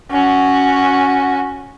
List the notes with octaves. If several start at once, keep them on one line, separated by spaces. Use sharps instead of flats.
C#4 F#4